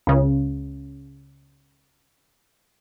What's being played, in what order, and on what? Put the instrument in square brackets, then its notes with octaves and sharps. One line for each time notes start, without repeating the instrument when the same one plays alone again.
[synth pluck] C#2 C#3